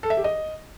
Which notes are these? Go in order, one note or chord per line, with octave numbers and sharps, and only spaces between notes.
A4
E5
G4
D#5